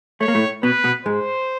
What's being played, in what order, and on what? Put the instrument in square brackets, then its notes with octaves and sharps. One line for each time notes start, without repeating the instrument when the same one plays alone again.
[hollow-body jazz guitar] A3 [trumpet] C#5
[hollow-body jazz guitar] A#3
A2 A3
[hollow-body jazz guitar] B2 B3 [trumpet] B4
[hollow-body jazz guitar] B2 B3
[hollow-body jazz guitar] G#2 G#3 [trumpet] C5